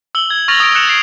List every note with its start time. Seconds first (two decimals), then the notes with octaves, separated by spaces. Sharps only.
0.15 E6 F#7 G7
0.30 G#6
0.48 C#6 F6 A6 A#6 F7 F#7
0.60 D#6 D7
0.75 F#6 A6 C#7 E7
0.88 G#6 C7 D7